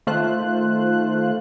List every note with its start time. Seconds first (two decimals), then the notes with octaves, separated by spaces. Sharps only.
0.07 D#3 A3 F4 C5 F#6